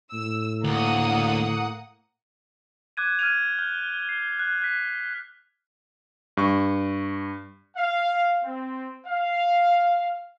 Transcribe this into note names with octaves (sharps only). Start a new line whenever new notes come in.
A2 E6
D2 A#3 F#5 D#6
D6 F#6 G#6 D#7
F6 G#6 D#7 F7
F6 G6 G7
C7
F#6
F#6 B6
G2 C#6
F5
C4
F5